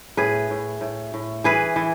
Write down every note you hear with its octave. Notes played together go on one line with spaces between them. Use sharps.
A2 G#4 B4
A2
A2
A2
E3 G#4 B4
E3